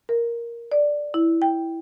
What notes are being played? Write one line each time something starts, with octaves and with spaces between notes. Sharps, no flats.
A#4
D5
E4
G5